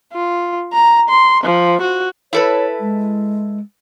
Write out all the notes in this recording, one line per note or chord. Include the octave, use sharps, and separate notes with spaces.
F4
A#5
C6
F3
F#4
E4 A4 B4 C#5
G#3